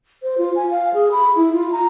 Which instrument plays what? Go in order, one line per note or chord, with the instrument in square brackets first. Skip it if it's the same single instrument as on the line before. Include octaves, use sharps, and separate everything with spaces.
[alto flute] C5
F4
G#5
F5
G#4
B5
E4
F4
A#5